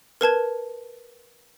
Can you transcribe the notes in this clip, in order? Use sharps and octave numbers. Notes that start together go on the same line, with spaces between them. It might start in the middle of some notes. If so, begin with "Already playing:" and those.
A#4 B4 A5 G#6